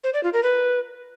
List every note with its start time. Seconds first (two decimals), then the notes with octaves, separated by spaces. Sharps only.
0.04 C5
0.14 D5
0.23 F4
0.33 A#4
0.43 B4